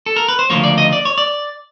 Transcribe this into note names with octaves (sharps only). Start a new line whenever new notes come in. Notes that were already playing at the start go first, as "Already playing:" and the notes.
A4
A#4
B4
C5
D2 C#3 F3 A#3 C#5
D5
D#5
D5
C#5
D5